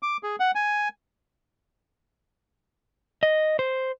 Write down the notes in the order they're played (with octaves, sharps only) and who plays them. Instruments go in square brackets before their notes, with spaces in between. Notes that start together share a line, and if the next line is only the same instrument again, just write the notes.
[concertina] D6
G#4
F#5
G#5
[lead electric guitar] D#5
C5